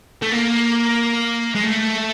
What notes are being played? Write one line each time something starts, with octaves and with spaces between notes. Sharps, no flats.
A3
A#3
G#3
A3